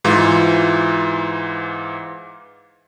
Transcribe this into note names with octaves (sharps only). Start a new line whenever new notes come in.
G#2 E3 F4